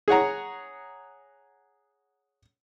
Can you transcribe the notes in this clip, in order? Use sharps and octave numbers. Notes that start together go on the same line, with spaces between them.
G#4 C#5 F#5 A#5